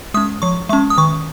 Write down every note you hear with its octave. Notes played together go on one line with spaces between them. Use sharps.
G#3 C#4 D#6
F3 C#6
G#3 C#4 C#6
D#6
D#3 C#6